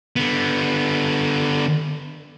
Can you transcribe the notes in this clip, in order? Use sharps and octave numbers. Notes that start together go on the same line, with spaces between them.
D3 B3